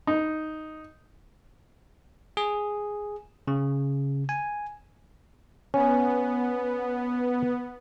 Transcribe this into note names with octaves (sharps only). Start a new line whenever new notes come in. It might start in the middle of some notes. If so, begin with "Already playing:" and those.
D#4
G#4
C#3
G#5
B3 C#4